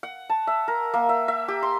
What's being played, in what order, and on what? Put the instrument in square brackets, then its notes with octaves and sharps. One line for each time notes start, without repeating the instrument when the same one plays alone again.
[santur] F#5
A5
E5
A#4
A#3
E5
E5
G4
C6